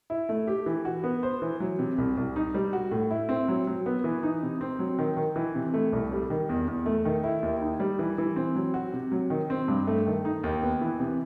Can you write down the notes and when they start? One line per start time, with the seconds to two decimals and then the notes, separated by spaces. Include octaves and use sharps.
0.10 E4
0.29 A3
0.48 G4
0.66 E3
0.85 F#4
1.04 B3
1.23 C5
1.42 E3
1.60 F#3
1.79 C3
1.98 C2
2.17 C2
2.36 D#4
2.54 G3
2.73 F#4
2.91 A2
3.11 E4
3.29 C4
3.48 F#3
3.67 F#3
3.86 B3
4.04 E3
4.23 D#4
4.43 C3
4.61 C4
4.79 F#3
4.98 D#3
5.17 D#3
5.36 E3
5.55 C3
5.74 A3
5.92 C2
6.12 G3
6.30 D#3
6.49 E2
6.68 E2
6.86 A3
7.05 D#3
7.24 E4
7.43 D#2
7.61 D#4
7.80 G3
7.99 E3
8.18 E3
8.36 C4
8.55 F#3
8.74 F#4
8.93 C3
9.12 F#3
9.30 D#3
9.50 C4
9.68 G2
9.87 A3
10.06 D#3
10.25 D#4
10.43 D#2
10.62 B3
10.81 E3
10.99 C3